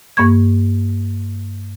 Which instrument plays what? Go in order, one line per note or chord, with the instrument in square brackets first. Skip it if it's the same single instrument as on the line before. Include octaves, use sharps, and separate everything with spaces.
[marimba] G2 A#3 C#6 G#6